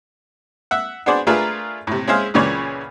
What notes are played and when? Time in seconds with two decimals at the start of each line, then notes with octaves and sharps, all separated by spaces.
0.71 E5 F#5
1.06 B3 D4 F#4 G#4 C5 D5
1.27 A3 D4 F4 G#4 A#4 B4
1.87 A2 C3
2.08 G#3 C#4 E4 G#4 C5 F5
2.34 C#2 A#2 C#3 E3 C#5 D5